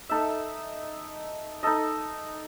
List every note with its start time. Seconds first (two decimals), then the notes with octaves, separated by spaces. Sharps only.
0.09 D#4 A4 E5
1.63 D#4 A4 D#5